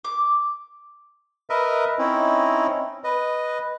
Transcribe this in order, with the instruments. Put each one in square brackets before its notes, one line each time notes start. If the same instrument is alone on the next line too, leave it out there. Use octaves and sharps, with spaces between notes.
[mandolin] D6
[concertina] A#4 B4 D#5 E5
C4 C#4 D#4 E4
B4 D#5